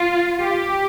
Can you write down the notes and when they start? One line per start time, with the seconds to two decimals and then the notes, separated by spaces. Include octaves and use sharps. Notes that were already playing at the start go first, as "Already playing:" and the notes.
Already playing: F4
0.41 G4